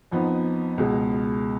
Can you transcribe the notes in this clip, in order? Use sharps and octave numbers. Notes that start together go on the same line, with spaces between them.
F2 F3 B3 D#4
C#2 B2 G#3